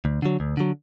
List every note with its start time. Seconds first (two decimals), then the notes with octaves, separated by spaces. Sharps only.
0.05 D2
0.22 D3 F#3
0.40 D2
0.57 D3 F#3